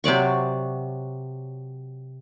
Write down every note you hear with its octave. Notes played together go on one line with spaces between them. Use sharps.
C3 F#3 D5 C#6